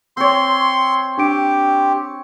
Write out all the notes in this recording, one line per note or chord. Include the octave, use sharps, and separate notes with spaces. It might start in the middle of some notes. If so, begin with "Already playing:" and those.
C4 C#5 C6
D4 G4 G5 D7